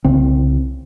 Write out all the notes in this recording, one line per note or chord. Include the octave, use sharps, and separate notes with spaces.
C2 C#3 C4